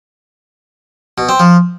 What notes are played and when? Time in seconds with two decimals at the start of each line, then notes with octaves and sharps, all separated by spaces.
1.18 B2
1.29 C4
1.40 F3